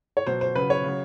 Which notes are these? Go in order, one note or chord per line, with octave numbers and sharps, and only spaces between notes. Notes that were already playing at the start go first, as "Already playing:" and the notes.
C#5
B2 F#3 C5
C5
C#3 F#3 B4
C#5
C#3 F#3